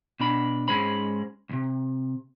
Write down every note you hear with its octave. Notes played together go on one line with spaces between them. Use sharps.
B2 D4 B5
G#2 G#3 C#4 C5 B5
C2 C3